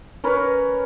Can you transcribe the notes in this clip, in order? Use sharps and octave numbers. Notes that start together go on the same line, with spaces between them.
C#4 A#4 B4 C#5